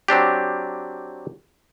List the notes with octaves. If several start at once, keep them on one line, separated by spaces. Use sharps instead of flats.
F#3 C4 D4 G4